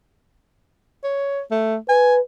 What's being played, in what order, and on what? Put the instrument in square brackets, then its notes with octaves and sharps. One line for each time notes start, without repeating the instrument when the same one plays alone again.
[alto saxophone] C#5
A3
[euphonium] B4 [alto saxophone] G#5